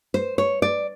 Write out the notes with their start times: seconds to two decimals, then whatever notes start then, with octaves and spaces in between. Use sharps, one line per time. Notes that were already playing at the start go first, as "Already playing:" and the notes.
0.14 C5
0.38 C#5
0.62 D5